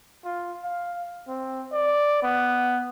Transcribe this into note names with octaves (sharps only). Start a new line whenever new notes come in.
F4
F5
C4
D5
B3